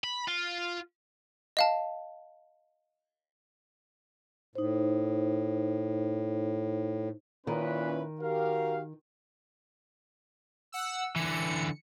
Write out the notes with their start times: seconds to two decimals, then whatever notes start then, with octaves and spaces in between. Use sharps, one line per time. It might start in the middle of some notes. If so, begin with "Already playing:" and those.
0.04 B5
0.28 F4
1.57 D#5 F5 A5
4.55 A2 D#4 C5
7.47 A#2 D#3 C#4 E4 B4
8.22 F#4 G4 A#4 F5
10.72 F#5 E6
11.16 D3 E3 C#7